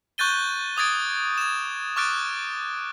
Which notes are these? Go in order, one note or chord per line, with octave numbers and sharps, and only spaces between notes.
C#6 F#6 G6 A6 D#7 G7
D6 D#6 G#6 A6 D7
G#6 E7
C#6 D6 F6 F#6 A6 D7